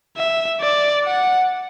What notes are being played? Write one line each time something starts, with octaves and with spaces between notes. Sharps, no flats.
E5
D5
F#5